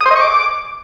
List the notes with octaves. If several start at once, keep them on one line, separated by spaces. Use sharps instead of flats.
D#6
C5
D#5
C#6
D6